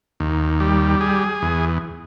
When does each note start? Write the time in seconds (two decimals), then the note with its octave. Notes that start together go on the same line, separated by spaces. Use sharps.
0.20 D#2
0.60 G3
1.01 G#4
1.42 E2